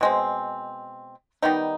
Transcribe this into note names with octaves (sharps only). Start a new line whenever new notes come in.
B2 G#3 C4
D#3 G3 B3 D#4